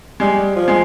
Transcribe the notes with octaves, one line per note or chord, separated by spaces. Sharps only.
G3 G#3
F3
G#3